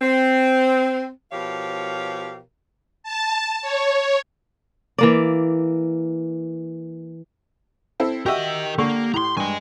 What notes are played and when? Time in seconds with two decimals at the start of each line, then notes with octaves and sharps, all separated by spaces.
0.02 C4
1.32 B2 F3 G4 A#4 C#5 F5
3.03 A5
3.62 C#5
4.98 E3 A#3 D5
8.00 C4 E4 A4
8.26 F#4 G4 A#4 D#5 E5 E6
8.78 D3 A#3 C#6
9.14 A2 A#5 C6
9.37 G2 D#5 G#5